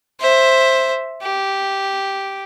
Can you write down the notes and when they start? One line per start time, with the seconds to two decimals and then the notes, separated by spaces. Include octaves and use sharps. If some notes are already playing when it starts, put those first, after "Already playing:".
0.20 C5 E5
1.22 G4